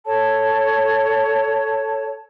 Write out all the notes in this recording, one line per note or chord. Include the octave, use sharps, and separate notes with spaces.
A4 C#5 A5